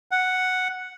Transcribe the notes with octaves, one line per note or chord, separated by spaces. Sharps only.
F#5